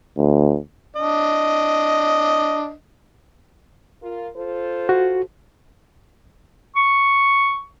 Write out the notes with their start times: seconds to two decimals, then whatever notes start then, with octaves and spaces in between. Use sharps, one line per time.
0.18 D2
0.96 D4 D#5
4.02 F4 A#4
4.36 F4 A4 C5
4.89 F#4
6.76 C#6